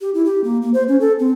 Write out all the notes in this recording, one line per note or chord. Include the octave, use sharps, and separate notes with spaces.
G4
E4
G4
A#3
A#3
C5
C#4
A4
C4